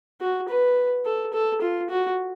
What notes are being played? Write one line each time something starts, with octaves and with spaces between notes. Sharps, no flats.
F#4
B4
A4
A4
F4
F#4